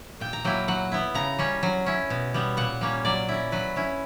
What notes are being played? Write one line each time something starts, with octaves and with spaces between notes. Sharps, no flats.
A#2 G5
A#5
F#3 A#3 E4 G5
F#3 F#5
B3 E4
C#3 A#5
G3 C#4
F#3
C#4 E4
B2
G3 B3
A#2 F#5
G3 A#3 C#4
F#3 D5
C#4 E4
F#3 B4
C#4 E4